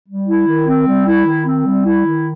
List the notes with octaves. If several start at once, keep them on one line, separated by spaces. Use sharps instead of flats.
G3
E4
D#3
C4
G3
E4
D#3
C4
G3
E4
D#3